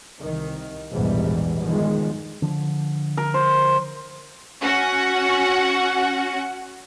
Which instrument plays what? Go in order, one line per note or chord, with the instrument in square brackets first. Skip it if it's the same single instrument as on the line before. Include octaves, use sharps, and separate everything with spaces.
[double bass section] C2 D#3
A#1 E2 G#2 B2 E3 G3
E2 G2 D#3 F3 G#3
[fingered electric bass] D3 F3
[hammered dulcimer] A#4
C5
[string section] C#4 F#4 F#5